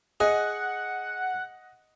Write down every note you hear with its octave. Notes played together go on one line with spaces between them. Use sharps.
G#4 D#5 F#5